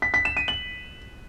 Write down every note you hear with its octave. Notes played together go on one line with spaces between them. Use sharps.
B6
B6
E7
D#7
F#7